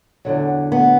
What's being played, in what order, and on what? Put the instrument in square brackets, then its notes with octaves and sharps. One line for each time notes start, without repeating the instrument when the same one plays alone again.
[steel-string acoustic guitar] E2 D3 F#3
B3